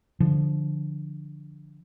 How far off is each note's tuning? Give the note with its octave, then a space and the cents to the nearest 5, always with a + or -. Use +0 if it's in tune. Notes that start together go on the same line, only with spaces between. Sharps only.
D3 +0 F3 -15